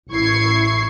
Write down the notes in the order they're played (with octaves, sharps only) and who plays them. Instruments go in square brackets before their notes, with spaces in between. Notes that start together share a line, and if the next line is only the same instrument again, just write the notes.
[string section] A1 E4 C#6 G#6 C7